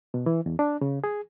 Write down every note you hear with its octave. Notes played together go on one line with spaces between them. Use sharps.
B2
E3
E2
D4
C#3
G#4